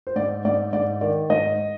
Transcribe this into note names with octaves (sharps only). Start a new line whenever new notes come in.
C5
G#2 D5
G#2 D5
G#2 D5
D#3 D5
G#2 D#5